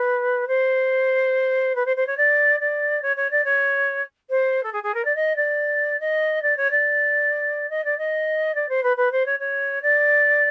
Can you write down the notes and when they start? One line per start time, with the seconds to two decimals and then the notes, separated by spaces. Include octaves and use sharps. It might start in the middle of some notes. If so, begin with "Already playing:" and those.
Already playing: B4
0.48 C5
1.75 B4
1.86 C5
1.96 C5
2.07 C#5
2.17 D5
2.60 D5
3.02 C#5
3.17 C#5
3.31 D5
3.45 C#5
4.30 C5
4.63 A4
4.73 G#4
4.83 G#4
4.94 A#4
5.05 D5
5.15 D#5
5.36 D5
6.00 D#5
6.42 D5
6.57 C#5
6.71 D5
7.70 D#5
7.85 D5
7.98 D#5
8.55 D5
8.69 C5
8.83 B4
8.97 B4
9.12 C5
9.26 C#5
9.40 C#5
9.82 D5